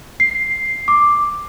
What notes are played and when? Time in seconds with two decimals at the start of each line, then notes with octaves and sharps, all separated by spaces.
0.20 C7
0.88 D6